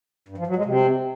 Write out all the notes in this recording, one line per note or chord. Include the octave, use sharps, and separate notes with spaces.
G2
F3
F#3
G#3
C3